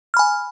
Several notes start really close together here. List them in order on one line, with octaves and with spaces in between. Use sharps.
F6 B5 G#5